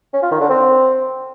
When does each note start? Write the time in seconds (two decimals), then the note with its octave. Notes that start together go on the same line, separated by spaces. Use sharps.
0.13 C#4
0.22 F4
0.31 D#3
0.40 D3
0.49 C4